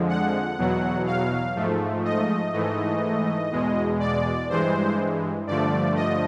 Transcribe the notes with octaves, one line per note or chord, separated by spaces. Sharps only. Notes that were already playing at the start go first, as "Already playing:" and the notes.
Already playing: F2 D3 F3 G#3
F#5
E2 B2 F#3
F5
G#2 F3 A3
D#5
G#2 E3 A3
E2 B2 G#3
D5
G2 E3 G#3 C5
G2 D3 F3 A3 D5
D#5